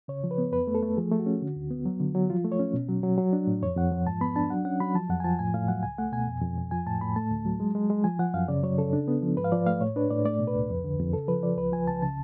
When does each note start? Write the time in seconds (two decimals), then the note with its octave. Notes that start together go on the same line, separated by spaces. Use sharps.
0.08 C#3 C#5
0.24 F3
0.31 B4
0.38 B3
0.52 F2 B4
0.67 A3
0.75 A4
0.82 A3
0.97 F3 G#4
1.11 A3
1.19 F#4
1.26 C#4
1.41 D3
1.56 D2
1.71 B3
1.86 F#3
2.00 D3
2.15 F#3
2.30 F3 F4
2.45 A3
2.52 C#5
2.59 C#4
2.74 B2
2.89 F#3
3.03 F#3
3.18 F#3
3.33 D4
3.47 A2
3.62 F2 C#5
3.77 F2 F#5
3.92 F3
4.07 G#2 A5
4.21 B3 B5
4.36 D4 A5
4.50 F#3 F#5
4.65 C#4 F#5
4.80 F#3 B5
4.95 F3 A5
5.09 F2 F#5
5.20 G#5
5.24 F3 A5
5.39 A2 G#5
5.54 A2 F5
5.68 F#3 F#5
5.83 C#2 G#5
5.98 A3 F#5
6.12 B2 G#5
6.28 F2
6.42 F2
6.57 F2
6.71 F3 G#5
6.87 A2 A5
7.01 A2 B5
7.16 A3 A5
7.31 D2
7.46 F#3
7.60 G#3
7.75 G#3
7.90 G#3
8.04 F3 G#5
8.19 F3 F#5
8.34 F#2 F5
8.48 C#3 D5
8.63 F#3 C#5
8.78 C#3 A4
8.93 D4
9.08 B3
9.22 F3
9.37 G#2 B4
9.44 F5
9.52 F3 D5
9.66 A3 F5
9.81 A2 C#5
9.96 D4 B4
10.10 A2 D5
10.25 A3 D5
10.40 B2
10.47 B4
10.55 C#2
10.70 F2
10.84 D3
10.99 F2
11.13 C#3 A4
11.28 F3 B4
11.43 F3 D5
11.58 C#2 B4
11.72 F3 G#5
11.88 C#2 A5
12.02 C#3 A5